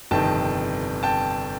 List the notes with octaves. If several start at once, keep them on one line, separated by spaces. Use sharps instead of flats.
G1 F2 C3 D#3 G5 A5
G5 A5